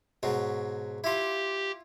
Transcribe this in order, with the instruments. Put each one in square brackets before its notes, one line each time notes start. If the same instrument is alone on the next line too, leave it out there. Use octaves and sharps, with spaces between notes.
[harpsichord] G#2 B2 F#3
[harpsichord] E4 F4 [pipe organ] G4